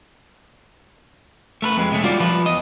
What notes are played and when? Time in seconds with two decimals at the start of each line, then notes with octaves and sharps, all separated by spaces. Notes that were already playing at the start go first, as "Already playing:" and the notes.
1.62 A3 A#4 B4
1.77 F2 G#3
1.92 C3 G#3 A3 C#4
2.03 G3 F4 F#4 D5
2.20 F3 B4
2.46 E2 D#5